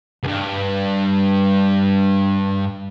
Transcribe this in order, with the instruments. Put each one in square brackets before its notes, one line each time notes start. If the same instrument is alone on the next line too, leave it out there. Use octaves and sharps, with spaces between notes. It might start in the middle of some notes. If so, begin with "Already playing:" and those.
[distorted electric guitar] C#2 G2